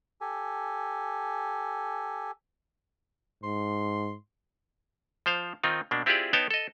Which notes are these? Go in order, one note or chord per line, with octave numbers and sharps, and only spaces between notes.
G4 A4 G#5
G#2 C6
F3 C5 F5
D#3 C4 D#4 F4
B2 A#3 D4
C4 E4 F4 G4 G#4 D5
B3 D#4 C#5 G5 A5
A4 D#5